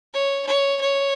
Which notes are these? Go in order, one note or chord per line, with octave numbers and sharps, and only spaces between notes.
C#5
C#5
C#5